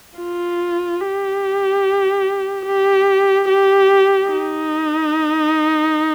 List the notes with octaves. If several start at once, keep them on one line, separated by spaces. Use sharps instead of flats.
F4
G4
G4
G4
D#4